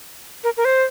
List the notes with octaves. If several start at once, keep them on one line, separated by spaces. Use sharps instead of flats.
A#4
A#4
C5